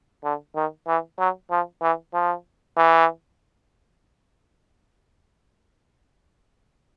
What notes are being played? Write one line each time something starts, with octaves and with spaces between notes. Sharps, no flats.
D3
D#3
E3
F#3
F3
E3
F3
E3